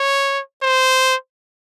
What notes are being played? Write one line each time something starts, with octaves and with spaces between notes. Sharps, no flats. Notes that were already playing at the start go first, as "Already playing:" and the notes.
Already playing: C#5
C5